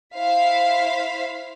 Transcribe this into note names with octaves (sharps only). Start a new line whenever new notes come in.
E4 C5 F5 B6